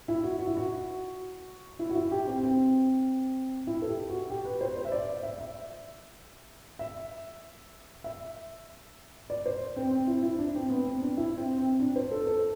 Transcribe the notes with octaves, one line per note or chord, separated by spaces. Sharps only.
E4
F#4
F#4
E4
F#4
E4
F#4
E4
G4
C4
C4
E4
A4
G4
F#4
G4
B4
C5
C5
E5
D5
E5
E5
E5
E5
D5
C5
C4
C4
E4
E4
D4
C4
B3
C4
D4
E4
C4
C4
D4
C5
A4
A4